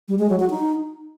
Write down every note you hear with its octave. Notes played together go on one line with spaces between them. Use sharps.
G3
G#3
F#3
F#4
D#4